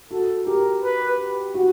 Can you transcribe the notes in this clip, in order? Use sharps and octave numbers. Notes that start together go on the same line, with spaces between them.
F#4 A4
G4 A#4
B4
F#4